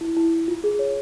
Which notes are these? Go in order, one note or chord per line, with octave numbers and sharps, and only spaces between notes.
E4
E4
E4
F4
G#4
C#5